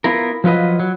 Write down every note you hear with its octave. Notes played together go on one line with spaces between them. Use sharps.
B3 E4 F4 A#4
F3 F#3 F4 B4 D#5
F#3